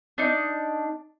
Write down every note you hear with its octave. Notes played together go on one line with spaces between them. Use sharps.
D4 D#4